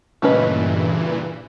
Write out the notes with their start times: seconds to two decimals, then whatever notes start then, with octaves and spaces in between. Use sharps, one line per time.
0.22 G2 A#2 C#3 E3 A3 C#4 B4 D#5